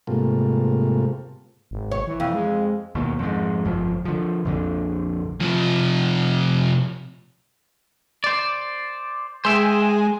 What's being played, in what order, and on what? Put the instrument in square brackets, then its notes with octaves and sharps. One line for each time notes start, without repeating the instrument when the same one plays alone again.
[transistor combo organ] G#2 C3 G3 A3 A#3 F4
[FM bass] G#1
[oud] C#5
[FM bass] E3
[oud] F2
[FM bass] G#3
[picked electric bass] D#2 B2
F2 G#2
G1 F2 F3
D3 F3
A#1 F2 D3
[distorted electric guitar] C3 F3
[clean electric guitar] C5 D5
[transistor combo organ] G#3 [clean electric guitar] C5 E5 G5